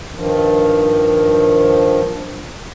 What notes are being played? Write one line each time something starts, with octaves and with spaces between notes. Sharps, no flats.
G2 D#3 F3